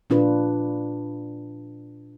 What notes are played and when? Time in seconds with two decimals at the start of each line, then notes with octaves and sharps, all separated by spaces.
0.10 A#2 D4 F4 B4